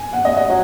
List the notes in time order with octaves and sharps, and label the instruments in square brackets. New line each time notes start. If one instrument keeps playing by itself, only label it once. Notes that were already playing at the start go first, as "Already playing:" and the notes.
Already playing: [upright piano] G#5
F#5
D#5
D#5
[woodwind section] F#3